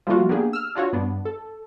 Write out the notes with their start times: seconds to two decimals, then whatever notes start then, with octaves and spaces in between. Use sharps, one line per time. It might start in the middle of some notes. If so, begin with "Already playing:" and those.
0.07 F3 G3 A3 A#3 F4 F#4
0.29 A#3 B3 D4 G4 G#4
0.53 E6 F6
0.75 D4 F4 F#4 C#5
0.93 G2 B3 D4
1.25 A4